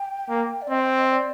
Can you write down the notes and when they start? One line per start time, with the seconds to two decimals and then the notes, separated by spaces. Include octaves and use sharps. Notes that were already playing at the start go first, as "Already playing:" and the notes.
Already playing: G5
0.29 A#3
0.62 D5
0.70 C4 D#5
1.11 D5